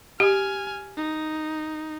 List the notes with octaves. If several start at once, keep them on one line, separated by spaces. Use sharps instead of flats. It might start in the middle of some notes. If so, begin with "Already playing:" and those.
G4 G#5 F6
D#4